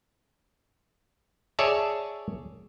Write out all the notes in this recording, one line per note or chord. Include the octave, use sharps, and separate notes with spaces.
G#4 C#5 D5 E5 A5